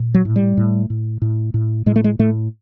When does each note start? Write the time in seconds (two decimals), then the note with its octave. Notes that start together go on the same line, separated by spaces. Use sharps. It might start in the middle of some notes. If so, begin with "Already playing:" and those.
Already playing: A#2
0.14 F#3
0.25 A2
0.36 G3
0.57 A2
0.90 A2
1.22 A2
1.54 A2
1.86 A2 G#3
1.96 A3
2.04 G#3
2.19 A2 A3